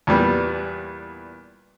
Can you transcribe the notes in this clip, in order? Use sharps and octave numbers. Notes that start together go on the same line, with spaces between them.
E2 A#2 G3 B3